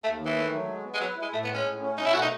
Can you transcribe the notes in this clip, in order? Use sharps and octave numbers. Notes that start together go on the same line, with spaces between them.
D#2 A3
D#3
E3
A3
F#3
G#3
B3
G#3
F#3 B4
E4
G#3
A2 A3
B3
G#3
C#4
A2
C#4
B2 D#4
E4
A3 F#4
D#4